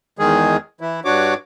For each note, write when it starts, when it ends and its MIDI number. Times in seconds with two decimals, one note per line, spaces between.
0.19 0.57 40
0.19 0.57 51
0.19 0.57 56
0.19 0.57 68
0.81 1.00 52
0.81 1.00 64
1.05 1.34 43
1.05 1.34 62
1.05 1.34 66
1.05 1.34 73
1.05 1.34 86